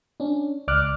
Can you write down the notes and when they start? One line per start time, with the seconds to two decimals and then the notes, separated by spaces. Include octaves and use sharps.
0.20 C#4 D4
0.68 C#2 D5 D6 F6 F#6